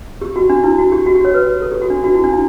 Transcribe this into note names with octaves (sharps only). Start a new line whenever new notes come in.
G4
F#4
D4
E4
F#4
G4
F#4
G4
C#5
B4
A4
G4
F#4
D4
F#4
E4
D4
E4